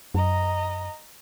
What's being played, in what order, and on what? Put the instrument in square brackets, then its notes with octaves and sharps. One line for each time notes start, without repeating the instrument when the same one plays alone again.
[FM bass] F#2 [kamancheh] D#5 A#5